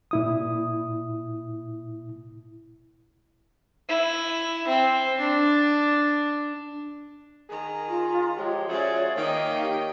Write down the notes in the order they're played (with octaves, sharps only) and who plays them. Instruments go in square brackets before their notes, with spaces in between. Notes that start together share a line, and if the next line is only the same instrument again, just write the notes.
[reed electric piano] A#2 E4 D#6
[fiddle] E4
C4
D4
[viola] D#3 A#5 [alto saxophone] G#4
[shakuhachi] F4
[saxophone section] F3 G#3 [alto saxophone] G4 [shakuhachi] C#5
[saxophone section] F3 F#4 G#4 [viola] C#4 D5 [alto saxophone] E5
[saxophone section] D#3 A#3 [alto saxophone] C#5 [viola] D#5 G5 [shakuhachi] F5
[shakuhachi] G4